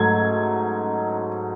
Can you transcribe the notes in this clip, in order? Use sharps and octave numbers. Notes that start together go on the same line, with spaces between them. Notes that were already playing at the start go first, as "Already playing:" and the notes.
Already playing: G#2 F#3 A3 G#6